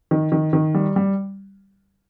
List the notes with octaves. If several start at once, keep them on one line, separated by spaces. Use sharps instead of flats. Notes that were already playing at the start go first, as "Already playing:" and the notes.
D#3
D#3
D#3
G3
G3